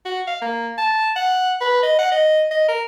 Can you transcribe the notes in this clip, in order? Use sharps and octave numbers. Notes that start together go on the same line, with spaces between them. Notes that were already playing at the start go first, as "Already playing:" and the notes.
F#4
F5
A#3
A5
F#5
B4
D#5
F#5
D#5
D#5
A#4